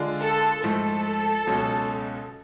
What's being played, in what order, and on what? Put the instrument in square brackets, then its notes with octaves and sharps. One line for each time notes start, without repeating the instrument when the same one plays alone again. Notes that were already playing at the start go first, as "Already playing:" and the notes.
Already playing: [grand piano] D3 G#3 D4 F4
[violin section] A4
[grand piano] G#2 F3 A3 [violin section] A4
[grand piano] C#2 B2 F#3 C#4